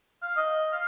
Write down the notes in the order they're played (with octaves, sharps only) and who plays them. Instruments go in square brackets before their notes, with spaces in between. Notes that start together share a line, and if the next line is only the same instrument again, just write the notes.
[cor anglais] F5
D#5
F5